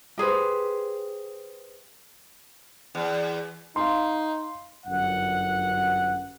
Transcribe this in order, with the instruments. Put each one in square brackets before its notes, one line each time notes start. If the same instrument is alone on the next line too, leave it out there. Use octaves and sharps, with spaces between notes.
[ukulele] G4 G#4 B4 C5
[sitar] E2
[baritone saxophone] D#4 [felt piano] F5 C6
[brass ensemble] G1 F#2 F#5